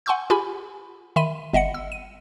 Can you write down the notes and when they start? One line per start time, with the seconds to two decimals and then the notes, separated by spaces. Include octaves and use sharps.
0.06 F#5 G#5 C6 C#6 E6 G6
0.30 F4 G4 G#4 G#5 B5
1.16 D#3 E5 B5 C6 D#7
1.54 G1 D#5 E5 F#5 C#7
1.74 E6
1.92 D#7